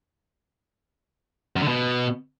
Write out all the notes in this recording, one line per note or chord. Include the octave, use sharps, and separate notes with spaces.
F#2
D3
B2